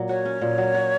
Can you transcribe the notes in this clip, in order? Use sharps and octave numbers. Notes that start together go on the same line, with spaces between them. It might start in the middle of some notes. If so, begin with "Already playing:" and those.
Already playing: A#2 F#3
F#4 C#5
C#4
A#2
F#3
F#4